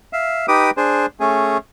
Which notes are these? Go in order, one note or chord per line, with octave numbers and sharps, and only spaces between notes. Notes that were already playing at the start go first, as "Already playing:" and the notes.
E5 F5
D#4 G4 B4 D6 D#6
D4 G#4 C5
A3 C#4 G#4